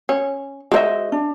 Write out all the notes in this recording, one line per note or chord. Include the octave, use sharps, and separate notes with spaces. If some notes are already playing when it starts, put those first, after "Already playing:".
C#4
G#3 F#4 A#4 C5 D#5 E5
D4